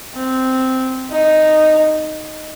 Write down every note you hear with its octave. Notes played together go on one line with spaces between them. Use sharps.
C4
D#4